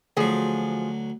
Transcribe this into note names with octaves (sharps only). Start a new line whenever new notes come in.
D2 F3 F#3 G#4